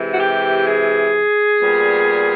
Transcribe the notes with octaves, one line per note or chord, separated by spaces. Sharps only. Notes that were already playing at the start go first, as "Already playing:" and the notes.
Already playing: C3 E3 G#3
F#4
G4
G#4
A#2 G3 B3